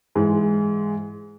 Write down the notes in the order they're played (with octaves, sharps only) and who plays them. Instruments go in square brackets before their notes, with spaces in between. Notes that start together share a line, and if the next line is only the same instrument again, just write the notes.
[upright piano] G#2 E3 G#3